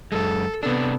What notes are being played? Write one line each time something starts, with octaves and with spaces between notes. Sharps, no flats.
F#2 G#3 A4
C3 B3 D4 A4